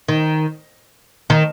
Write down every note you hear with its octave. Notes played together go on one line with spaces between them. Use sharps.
D#3
D#3